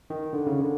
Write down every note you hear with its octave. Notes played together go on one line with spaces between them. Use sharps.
D#3
D3
C#3
D3